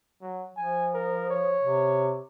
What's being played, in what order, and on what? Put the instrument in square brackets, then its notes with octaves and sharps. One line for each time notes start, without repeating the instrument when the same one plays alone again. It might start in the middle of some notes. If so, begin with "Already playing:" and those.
[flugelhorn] F#3
[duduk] F3 [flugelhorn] G#5
[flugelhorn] A#4
C#5
[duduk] C3